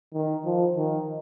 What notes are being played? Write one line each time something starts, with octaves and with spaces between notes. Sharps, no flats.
D#3
F3
D#3